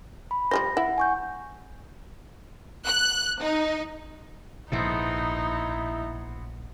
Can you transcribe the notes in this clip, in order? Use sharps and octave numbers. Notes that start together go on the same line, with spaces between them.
B5
F3 G3 C5 A#6
E4 F#5
G#5 C#6 G6
F#6
D#4
A#1 G#2 B2 B3 C4 D#4 E4 A4